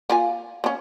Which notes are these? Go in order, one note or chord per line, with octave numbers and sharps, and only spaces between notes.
A#3 F4 G#5
A#3 C#4